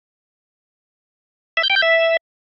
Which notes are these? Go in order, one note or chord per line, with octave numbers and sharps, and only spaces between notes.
E5
G6
G5
G6
E5